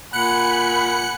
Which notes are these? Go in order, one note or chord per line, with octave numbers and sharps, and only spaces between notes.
A#2 F#5 G#5 B5 F#6 C#7